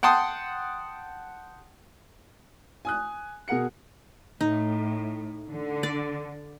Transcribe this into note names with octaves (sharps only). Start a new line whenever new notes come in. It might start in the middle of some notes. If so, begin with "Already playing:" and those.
F#5 G5 A5 C6 D#6
G#5 D#6 F#6
B2 G#4 A#4 F#5 C#7
A2 D#4
D3
D5